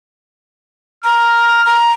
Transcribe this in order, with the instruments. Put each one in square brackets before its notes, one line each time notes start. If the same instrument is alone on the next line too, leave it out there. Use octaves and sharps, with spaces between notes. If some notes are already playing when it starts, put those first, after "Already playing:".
[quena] A#5 [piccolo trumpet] F6
[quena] A#5